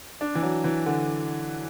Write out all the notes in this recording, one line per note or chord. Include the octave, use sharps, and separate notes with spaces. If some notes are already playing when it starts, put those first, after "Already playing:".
D4
E3
F#3
E3
D3